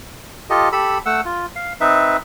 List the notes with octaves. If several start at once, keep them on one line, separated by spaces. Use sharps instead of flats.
F4 G4 A4 D#5
G4 A4 B5 E6
A3 F#5 E6
F4
F5
C4 D#4 B4 E5